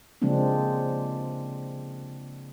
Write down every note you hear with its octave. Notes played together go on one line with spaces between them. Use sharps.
C#3 F3 G#3 A#3 C4 D4